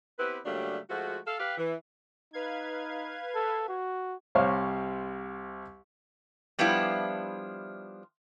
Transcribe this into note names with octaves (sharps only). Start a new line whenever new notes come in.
B3 C4 E4 G4 B4
C#3 F#3 G3 A3 A#3 D4
F3 G#3 A3 F#4
A4 F5
G4 B4 F5
E3
D#4 B4 F5 G#6
A4
F#4
C2 C3 C5 C#5 F5
F3 G3 B3 D4 E4 F4